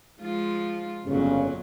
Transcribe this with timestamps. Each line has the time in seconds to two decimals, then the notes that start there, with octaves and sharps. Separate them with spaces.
0.21 F3 G#3 F4
1.05 G1 F2 A#2 C#3 F#3